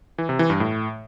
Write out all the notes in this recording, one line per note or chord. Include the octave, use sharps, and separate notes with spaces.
E3
C3
E3
G2
A2